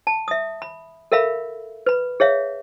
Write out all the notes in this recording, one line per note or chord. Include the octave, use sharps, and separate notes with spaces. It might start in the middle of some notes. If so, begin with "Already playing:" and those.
A5
E5 D#6
B5
A4 A#4 E5 F5 B5
B4 B5
G#4 C#5 E5 F5